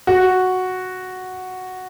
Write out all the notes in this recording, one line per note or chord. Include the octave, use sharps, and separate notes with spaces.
F#4